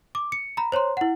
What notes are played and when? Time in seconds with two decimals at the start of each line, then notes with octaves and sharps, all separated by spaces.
0.15 D6
0.32 C#7
0.57 A#5 B5
0.72 C5 C#5 A#5 C6
0.97 E4 F#5